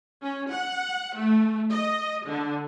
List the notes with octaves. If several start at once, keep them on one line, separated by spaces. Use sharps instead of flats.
C#4
F#5
A3
D#5
D3